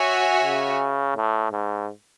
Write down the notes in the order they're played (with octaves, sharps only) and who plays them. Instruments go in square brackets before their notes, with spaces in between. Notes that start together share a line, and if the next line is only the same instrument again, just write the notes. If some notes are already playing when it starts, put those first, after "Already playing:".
Already playing: [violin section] F#4 C#5 E5 G#5
[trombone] C#3
A2
G#2